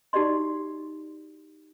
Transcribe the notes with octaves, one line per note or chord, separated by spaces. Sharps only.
D#4 F#4 G4 D5 D#5 C6